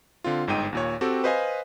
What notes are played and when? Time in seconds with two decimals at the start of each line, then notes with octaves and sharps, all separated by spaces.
0.24 D3 C4 F4
0.47 G1 G#2 D#4 G5 D#7
0.73 D#2 A#2 C#5
1.01 C4 F#4 G4 A4
1.24 B4 C5 D#5 F5 G#5